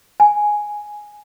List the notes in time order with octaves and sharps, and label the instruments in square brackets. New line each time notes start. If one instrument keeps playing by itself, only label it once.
[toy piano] G#5